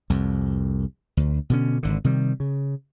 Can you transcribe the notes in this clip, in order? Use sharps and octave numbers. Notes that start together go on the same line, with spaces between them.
C2 F2
D2
B2 D3 C#4
G#1 D3
C3 D#3 G3
C#3